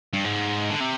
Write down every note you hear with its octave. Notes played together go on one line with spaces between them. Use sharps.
G2
G#2
D3
C3